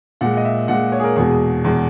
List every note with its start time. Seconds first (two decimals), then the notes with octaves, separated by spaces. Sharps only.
0.21 A#2 G#3 F#5
0.37 D#5
0.45 E5
0.68 A#2 G#3 F#5
0.92 C#5
0.99 G#4
1.04 A#4
1.16 E2 B2 G#3 G#4
1.64 E2 B2 G#3